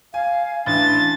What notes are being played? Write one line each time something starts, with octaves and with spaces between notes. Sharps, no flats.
F5 G#5
A1 D4 A6